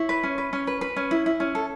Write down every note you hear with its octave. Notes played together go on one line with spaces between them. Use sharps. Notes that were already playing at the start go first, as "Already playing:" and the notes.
Already playing: E4 C#5
B4
C#4
B4
C#4
B4
B4
C#4
E4
E4
C#4
A4